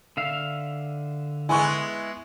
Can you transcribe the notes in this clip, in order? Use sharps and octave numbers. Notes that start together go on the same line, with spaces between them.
D3 E5 F5
G#3 B3 E4 G#5 C6 C#6